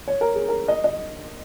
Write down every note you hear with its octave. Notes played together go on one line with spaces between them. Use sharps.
C#5
A#4
G#4
A#4
D#5
D#5